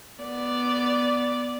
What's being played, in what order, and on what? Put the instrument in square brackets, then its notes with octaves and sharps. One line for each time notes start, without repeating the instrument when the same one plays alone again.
[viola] B3 D5